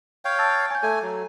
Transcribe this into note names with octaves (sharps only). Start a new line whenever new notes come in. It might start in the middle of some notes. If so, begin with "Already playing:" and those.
C#5 F5 G5
A5 E6 A6
C#5 G#5 G6
A3 A4 G#5
F#3